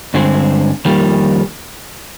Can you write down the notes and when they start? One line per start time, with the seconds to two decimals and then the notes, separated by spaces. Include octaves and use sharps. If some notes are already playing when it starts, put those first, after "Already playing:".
0.14 G2 D3 G#3 C4
0.85 F2 D#3 G3 A#3